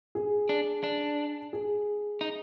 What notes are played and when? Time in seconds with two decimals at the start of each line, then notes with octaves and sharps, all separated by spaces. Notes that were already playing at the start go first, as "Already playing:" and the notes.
0.15 G#4
0.49 D4
0.83 D4
1.53 G#4
2.21 D#4